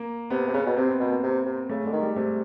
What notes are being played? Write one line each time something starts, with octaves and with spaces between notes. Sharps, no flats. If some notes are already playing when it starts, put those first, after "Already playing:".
Already playing: A#3
C3 B3
C3
C#3 B3
B2
C3 C4
B3
B2 A#3
B3
C3
C3
C#3 A3
D3 G#3
D#3
G3
C3 A3